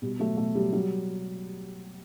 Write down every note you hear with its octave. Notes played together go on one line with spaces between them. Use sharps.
B2 G3
F#3 A3
B2 A3
F#3 G3
F#3 G3